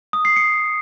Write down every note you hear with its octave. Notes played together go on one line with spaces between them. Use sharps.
D#6
C7
C#7